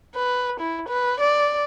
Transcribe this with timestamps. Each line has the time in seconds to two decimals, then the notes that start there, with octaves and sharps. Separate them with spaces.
0.15 B4
0.60 E4
0.88 B4
1.20 D5